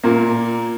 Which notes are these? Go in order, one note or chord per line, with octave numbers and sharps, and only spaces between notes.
A#2 A#3